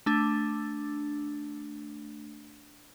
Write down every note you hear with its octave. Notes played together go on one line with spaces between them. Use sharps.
A3 D4